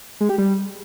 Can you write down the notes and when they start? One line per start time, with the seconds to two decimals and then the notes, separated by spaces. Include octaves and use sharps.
0.20 G#3
0.29 G4
0.38 G3